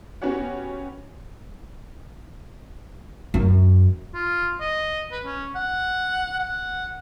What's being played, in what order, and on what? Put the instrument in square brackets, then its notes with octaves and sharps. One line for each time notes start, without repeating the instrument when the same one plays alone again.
[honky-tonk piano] B3 C#4 F#4 G4 C#5 F#5
[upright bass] F#2
[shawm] F4
D#5
B4
C#4
F#5
F#5